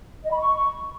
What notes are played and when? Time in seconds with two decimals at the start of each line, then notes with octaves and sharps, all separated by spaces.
0.24 D#5
0.31 B5
0.37 C#6